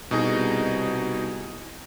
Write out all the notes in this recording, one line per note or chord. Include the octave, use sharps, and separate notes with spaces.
C2 B2 D#4 G#4